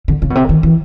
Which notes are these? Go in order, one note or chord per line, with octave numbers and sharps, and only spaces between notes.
D3
C#3
B2
C3
D#3
E3